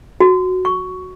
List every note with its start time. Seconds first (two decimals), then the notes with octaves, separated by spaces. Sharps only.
0.20 F#4
0.65 C#6